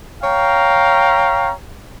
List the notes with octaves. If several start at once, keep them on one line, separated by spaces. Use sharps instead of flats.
C#5 F5 G5 A#5